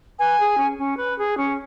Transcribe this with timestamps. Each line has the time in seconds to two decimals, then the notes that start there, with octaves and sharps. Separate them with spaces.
0.19 B4 G#5
0.39 G#4
0.58 C#4
0.78 C#4
0.97 B4
1.17 G#4
1.36 C#4